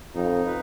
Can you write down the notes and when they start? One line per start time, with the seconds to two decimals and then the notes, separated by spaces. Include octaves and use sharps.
0.15 F2 D#4
0.46 B4